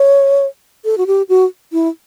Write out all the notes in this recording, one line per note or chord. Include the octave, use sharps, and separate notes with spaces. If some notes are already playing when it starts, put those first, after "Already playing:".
Already playing: C#5
A4
F#4
G4
F#4
E4